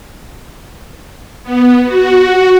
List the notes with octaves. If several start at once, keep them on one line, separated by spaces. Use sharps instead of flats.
B3
F#4